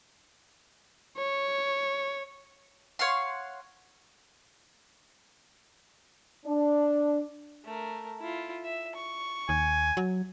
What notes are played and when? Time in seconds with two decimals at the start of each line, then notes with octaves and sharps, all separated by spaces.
1.17 C#5
2.99 C#5 F5 F#5 C6
6.45 D4
7.65 A3 A#4
8.20 E4 F4
8.64 E5
8.95 C#6
9.49 D#2 G#5
9.97 F#3